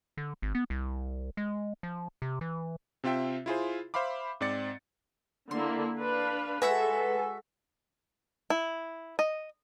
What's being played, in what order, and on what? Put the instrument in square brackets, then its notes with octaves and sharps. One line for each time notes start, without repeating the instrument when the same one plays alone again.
[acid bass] D3
G#1
B3
C2
G#3
F3
C3
E3
[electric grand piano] C3 C4 F4 E5 G5
E4 F4 G#4 C5
C5 E5 F5 B5 D6
G#2 C4 D5 A6 C#7
[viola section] D3 A#3 E4 [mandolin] C6
[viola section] D4 B4 F5
[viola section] G#3 A4 [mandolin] F#4 E5 F#5 [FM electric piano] B4 G#5
[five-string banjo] E4
D#5